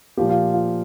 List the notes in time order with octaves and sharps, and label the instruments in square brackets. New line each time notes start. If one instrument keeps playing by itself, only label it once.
[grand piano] A#2 F3 A#3 G4
F4
F4